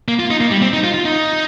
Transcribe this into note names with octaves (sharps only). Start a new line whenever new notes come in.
A#3
F4
D#4
A#3
G3
C4
D#4
F4
F4
D#4